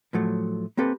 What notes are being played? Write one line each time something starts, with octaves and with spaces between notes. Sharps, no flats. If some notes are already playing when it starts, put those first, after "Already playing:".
A2 F3 F#3 A3
A#3 C4 G4 A4 B4